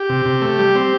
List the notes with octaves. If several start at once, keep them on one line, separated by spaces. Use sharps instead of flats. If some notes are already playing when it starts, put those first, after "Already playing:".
Already playing: G4
C3
C3
A3
G3
C4